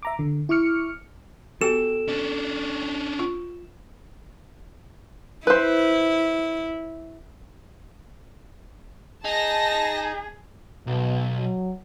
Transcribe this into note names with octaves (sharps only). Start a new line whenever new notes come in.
E5 A#5 D6
D3
E4 C#6 D6 F6 C#7
B3 F#4 G4 A4 G5 E7
C#4 D4
F4
E4 B4 C5
D#4 G#4 A5 A#6
B1 B2
F#3